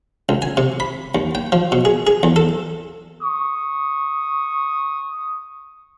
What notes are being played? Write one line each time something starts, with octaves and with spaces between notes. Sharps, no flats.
C#2
G#5
C3
B5
D#2
G5
F3
B2
G#4
G#4
E2
A4
C#6 D#6